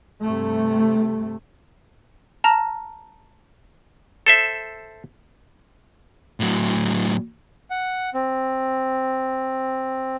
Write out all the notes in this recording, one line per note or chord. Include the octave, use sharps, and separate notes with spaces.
G2 C3 A3
A5 A#5 F6 A#6
A4 C5 E5
A2 F#3
F#5
C4